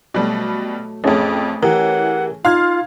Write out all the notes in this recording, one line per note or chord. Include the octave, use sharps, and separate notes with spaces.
B2 F#3 G3 A3
A1 F2 A3 C#4 G#4
E3 G4 A#4 F#5
D#4 F4 F5 C6 F6 G#6